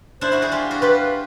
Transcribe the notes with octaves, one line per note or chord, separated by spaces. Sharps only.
D4 E4 C5
E4 F#4
F#4 G#4
F4 G4
F#4
F4 G4 B4